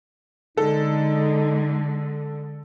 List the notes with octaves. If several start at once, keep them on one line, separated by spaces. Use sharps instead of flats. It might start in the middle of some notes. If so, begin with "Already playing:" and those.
D3 G#3 D#4 A4